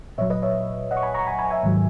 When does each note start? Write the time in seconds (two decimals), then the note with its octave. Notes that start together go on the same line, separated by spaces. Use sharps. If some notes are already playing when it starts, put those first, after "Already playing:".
0.18 A#2 F#3 C#5 E5
0.30 B4 D#5
0.42 C#5 E5
0.91 D#5 F#5
0.97 C#6
1.03 G#5 B5
1.14 A#5 C#6
1.27 G#5 B5
1.39 G#5 B5
1.51 E5 G#5
1.63 G#2 D#3 F#3